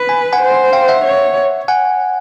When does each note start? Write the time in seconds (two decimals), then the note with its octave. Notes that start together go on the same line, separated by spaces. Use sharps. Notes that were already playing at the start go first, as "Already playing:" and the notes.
Already playing: B4
0.09 G#5
0.33 F#5 G#5
0.41 C5
0.73 F5 G5
0.88 E5 F#5
1.05 C#5
1.68 F#5 G#5